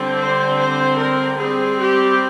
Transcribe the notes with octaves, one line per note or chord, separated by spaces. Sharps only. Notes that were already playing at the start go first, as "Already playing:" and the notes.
Already playing: D3 G3 C4
C5
C5
A#4
G3 C4 G#4
G4